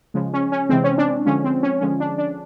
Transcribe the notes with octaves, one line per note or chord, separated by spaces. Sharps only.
C#3 F3 G#3
C#4
C#4
C3 E3 G#3 C4
C#4
D4
D3 F3 G#3 C#4
C4
C#4
D3 F3 G#3 C#4
D4
D4